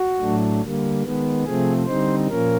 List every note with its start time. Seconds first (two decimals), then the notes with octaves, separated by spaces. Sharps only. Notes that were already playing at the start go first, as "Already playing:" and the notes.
Already playing: F#4
0.19 A2 F#3 A3 D4
0.61 D3 G3 A#3
1.03 D#3 G#3 B3
1.44 C3 F3 A3 C4 G#4
1.86 D3 G3 C4 D#4 C5
2.28 A#2 F3 A#3 C#4 A#4